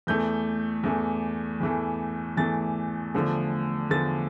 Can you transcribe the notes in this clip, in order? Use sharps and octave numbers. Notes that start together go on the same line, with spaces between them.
E2 E3 A3 G6
E2 E3 A3
E2 E3 A3
E2 E3 A3 A6
E2 D3 F3 A3
E2 D3 F3 A3 A6